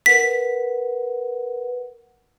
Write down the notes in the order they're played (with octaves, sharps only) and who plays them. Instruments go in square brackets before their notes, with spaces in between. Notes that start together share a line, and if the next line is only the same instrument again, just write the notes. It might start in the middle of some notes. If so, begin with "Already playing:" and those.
[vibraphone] A#4 B4 F#5 [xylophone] B6